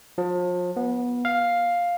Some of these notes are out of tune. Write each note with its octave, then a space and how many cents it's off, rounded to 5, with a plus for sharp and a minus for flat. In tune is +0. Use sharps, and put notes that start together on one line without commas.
F3 +35
B3 -20
F5 +5